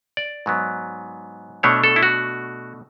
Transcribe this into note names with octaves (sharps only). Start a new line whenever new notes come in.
D5
G#2 F#3 B3
B2 A3 D4 C#5
A4
E4
F#4